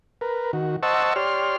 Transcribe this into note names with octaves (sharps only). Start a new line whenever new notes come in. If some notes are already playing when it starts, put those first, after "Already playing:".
A#4 B4
D#3 F#4
C5 D#5 F#5 A5 C#6 E6
G4 C#5 D5 C6 F6